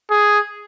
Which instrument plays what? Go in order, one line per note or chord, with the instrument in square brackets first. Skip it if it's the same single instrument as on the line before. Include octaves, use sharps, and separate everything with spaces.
[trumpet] G#4